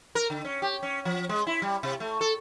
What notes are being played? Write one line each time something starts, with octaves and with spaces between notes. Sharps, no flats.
A#4
D3
C#4
G4
C#4
F3
G#3
E4
G3
C3
A3
A4